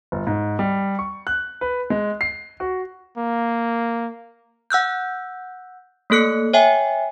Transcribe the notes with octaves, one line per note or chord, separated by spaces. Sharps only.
G1
G#2
G3
C#6
F#6
B4
G#3
C7
F#4
A#3
F#5 E6 F#6 G6
A3 A#3 A4 F#6 C#7
C#5 E5 G5 G#5